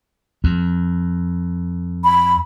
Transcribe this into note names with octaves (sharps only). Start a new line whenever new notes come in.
F2
B5